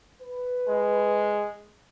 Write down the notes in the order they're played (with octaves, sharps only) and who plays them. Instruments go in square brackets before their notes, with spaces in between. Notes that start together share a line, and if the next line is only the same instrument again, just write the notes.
[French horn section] B4
[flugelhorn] G#3